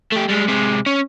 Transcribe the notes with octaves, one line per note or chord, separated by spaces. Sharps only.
A3 G4
G3 G#3
C3 G#3
C#4